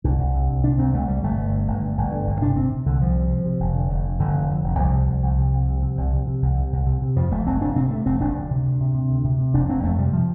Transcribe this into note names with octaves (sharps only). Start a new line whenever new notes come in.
C2 D4
C2
C3
C2
C3 D4
C2 C4
C2 A3
C3 G3
G1 A3
G1
G2
G1
G2
G1
D3
G1
C3 D4
C3 C4
C3
C2 D3
C2 F3
C3
C3
C3
F1
D3
F1
F2
F1 D3
F2
F2
F1
C2 F3
C3
C2
C2
C3
C2
C3
C3
C2
C3
C3
C2
C3
C2
C3
C3
F2 F3
F1 A3
F1 C4
F1 D4
C3 C4
C3 A3
F1 C4
F1 D4
D2
C3
D2
C3
C3
D2
C3
C3
F1 D4
F1 C4
F2 A3
C3 G3
C3 F3